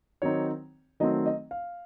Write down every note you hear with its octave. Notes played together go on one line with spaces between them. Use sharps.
D#3 F#3 C4 D#4 C#5
D#3 F#3 A3 C4 D#4 D#5
D#5
F5